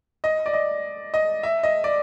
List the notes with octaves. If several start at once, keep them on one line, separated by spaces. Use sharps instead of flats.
D#5
D5
D#5
D#5
E5
D#5
D5